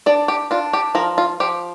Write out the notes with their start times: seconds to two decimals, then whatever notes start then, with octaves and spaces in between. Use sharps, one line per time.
0.06 D4 D5
0.28 G4
0.51 D4 F4
0.73 G4
0.95 F3 A#4
1.18 F4
1.40 F3 G4